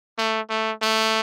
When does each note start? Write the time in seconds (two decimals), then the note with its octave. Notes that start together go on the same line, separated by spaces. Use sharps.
0.18 A3
0.49 A3
0.82 A3